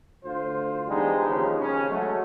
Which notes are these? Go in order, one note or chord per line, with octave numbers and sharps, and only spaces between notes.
D2 F4 C5
E3 G3 G#3 B3 D4 D#4
D#2 C#3 F3
C#3 C#4
F#3 G#3 A3